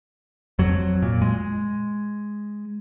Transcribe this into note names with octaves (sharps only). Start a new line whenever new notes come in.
F2 F#3
A#2
G#3